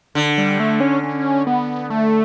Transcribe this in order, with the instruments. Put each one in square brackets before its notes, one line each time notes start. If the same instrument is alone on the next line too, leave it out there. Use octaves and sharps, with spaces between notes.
[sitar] D3
[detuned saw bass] G3
A3
C#4
C#4
B3
A3